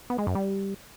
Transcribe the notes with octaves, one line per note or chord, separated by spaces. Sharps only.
B3
G#3
F#2
G3